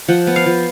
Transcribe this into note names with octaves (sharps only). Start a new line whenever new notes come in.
F3 F#5
B3
F5
F3